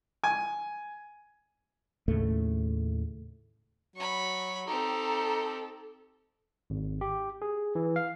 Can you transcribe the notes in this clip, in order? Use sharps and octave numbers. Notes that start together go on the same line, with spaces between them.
G#5
D#2 A2 C#3 A3
F#3 B5 C#6
C4 D#4 G4 A4 A#5
G#1
G4
G#4
E3
F5